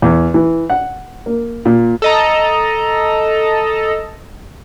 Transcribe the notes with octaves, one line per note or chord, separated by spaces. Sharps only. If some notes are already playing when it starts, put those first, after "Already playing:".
E2
E3
F#5
A#3
A#2
A4 D#5 A#5